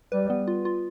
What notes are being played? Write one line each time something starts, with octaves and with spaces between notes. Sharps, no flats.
G3 B4
B3
F4
F4